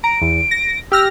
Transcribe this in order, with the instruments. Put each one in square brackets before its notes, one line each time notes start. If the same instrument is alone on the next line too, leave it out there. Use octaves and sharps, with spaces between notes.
[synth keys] A#5 [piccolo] D7
[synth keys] E2
A#6
[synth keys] G4 F6 A#6 [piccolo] E6